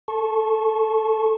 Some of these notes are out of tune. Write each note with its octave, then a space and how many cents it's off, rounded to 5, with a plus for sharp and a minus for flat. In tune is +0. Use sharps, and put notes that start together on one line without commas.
A4 +0 A5 -20 C#6 -30